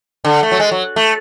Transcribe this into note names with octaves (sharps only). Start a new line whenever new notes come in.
D3
A3
F#3
G#3
F#3
A3